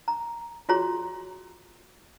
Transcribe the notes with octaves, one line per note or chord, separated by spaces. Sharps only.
A#5
F4 F#4 G#4 C#5 A#5 C6